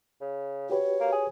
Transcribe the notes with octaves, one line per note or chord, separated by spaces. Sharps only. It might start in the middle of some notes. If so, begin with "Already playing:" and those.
C#3
F#4 G4 B4 C#5
A#3
G#4